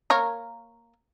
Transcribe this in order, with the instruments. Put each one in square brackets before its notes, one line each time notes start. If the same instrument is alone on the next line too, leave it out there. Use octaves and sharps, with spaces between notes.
[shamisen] A#3 A#4 C#5